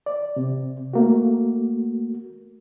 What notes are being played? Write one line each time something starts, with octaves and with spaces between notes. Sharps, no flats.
D5
C3
A3 A#3 F#4